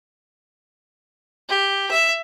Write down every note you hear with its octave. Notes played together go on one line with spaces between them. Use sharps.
G4
E5